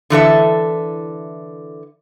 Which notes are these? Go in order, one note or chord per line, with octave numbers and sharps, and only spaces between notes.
D3 E3 A4 E5